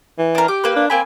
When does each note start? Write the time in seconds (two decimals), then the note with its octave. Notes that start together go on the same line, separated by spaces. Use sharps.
0.18 E3
0.35 D4 A#4
0.48 G4 D6
0.64 A#3 B4
0.76 D4
0.90 A#3 C4 G#5 B5